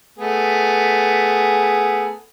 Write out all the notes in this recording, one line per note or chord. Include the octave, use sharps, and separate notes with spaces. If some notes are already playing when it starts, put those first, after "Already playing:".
A3 B3 G#4